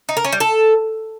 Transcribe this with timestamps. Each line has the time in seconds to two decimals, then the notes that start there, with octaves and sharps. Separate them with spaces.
0.09 D#4
0.17 A#4
0.25 C#4
0.32 G3
0.40 A4